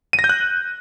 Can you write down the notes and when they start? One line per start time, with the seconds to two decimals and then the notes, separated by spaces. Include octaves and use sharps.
0.13 D#7
0.19 A#6
0.24 G6
0.29 F#6